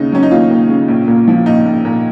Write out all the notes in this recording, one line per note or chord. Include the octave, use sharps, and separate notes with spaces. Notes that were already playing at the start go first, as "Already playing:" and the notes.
Already playing: D#2 C#3 D#4
F#3 C#4
D#4
D#2 F4
D#2
C#3
A#1
A#2
F3
A#1 D#4
A#1
A#2